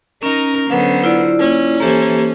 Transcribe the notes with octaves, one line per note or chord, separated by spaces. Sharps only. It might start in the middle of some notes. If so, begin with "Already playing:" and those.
C#4 D#4 A#4
D3 F#3 B3 C5
E4 F4 D5
A#3 C#4
E3 A#3 G4 A4 C5